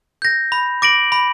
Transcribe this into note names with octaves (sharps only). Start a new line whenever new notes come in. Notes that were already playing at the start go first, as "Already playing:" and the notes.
G6 A#6
B5
D6 A#6 D7 F#7
B5